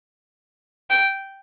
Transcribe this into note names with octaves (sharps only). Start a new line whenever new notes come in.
G5